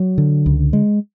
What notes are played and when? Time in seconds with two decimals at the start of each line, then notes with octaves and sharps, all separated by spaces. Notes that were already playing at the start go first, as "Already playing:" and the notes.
Already playing: F#3
0.18 D3
0.46 C#2
0.73 G#3